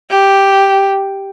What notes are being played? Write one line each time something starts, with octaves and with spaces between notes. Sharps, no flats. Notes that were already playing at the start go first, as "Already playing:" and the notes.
G4